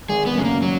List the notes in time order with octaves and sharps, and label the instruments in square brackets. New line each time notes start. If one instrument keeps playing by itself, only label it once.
[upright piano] G#1 [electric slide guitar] G#4
[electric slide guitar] B3
[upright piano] F#2 C#3 F#3 [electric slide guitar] G#3
[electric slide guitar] A#3
F#3